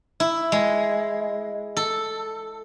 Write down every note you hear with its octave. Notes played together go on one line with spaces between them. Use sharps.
E4
G#3
A4